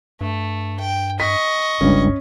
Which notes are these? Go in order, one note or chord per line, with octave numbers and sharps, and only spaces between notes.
G2 A3
G5
D#5 C#6 B6
F#1 C#2 G2 C#4